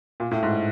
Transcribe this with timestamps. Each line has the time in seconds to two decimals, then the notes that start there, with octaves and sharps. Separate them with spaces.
0.20 A#2
0.31 A2
0.43 G#2